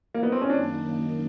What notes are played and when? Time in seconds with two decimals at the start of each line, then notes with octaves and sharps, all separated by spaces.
0.14 A#3
0.23 B3
0.32 C4
0.42 C#4
0.50 F#2 D#3 F#3 A#3 D4 D#4